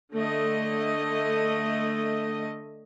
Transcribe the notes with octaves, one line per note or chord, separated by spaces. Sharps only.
D3 A3 D#5